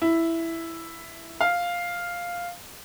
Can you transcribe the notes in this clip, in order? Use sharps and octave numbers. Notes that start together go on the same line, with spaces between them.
E4
F5